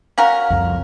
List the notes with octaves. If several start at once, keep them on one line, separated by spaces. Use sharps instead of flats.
C#4 F#4 A#4 F5
C2 F2